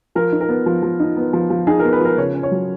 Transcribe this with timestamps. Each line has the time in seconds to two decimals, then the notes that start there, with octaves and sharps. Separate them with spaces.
0.15 F3 A#4
0.32 D#4
0.41 A#4
0.49 B3
0.66 F3
0.82 F3
1.00 D#4
1.17 B3
1.33 F3
1.50 F3
1.67 D#4 G#4
1.80 B3 A#4
1.93 B4
2.00 F3 A#4
2.17 C#3 C#5
2.35 C#4
2.43 C#5
2.51 F#3